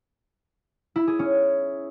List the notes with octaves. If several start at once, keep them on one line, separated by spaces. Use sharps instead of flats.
E4
G#4
C#4